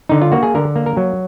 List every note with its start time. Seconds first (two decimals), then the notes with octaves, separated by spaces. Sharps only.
0.09 D3 D#4
0.22 F4
0.32 A#3 F#4
0.43 G#4
0.55 D3 A#4
0.76 A#3
0.86 A#4
0.97 F#3